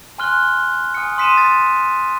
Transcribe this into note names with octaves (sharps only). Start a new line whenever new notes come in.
G#5 C6 F6 F#6 G7
G#5 D#6 F6 C#7
C6 D#6 B6 C#7 D#7 E7
A6